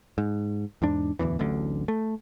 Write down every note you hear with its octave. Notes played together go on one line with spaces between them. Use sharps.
G#2
E2 G#2 D4
D1 G1 E2 E3
D1 A1 D2 D3
A3